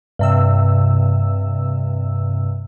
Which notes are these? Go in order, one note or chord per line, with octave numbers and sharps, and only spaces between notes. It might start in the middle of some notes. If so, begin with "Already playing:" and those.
G2 C3 E6